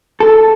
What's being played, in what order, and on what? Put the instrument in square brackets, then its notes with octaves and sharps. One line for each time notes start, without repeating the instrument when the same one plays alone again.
[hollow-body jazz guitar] A4